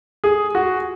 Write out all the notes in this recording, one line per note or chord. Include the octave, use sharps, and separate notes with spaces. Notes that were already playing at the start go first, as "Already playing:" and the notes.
G#4
F#4